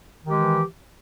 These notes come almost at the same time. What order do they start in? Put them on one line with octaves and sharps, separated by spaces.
D#3 G4 G#3 E3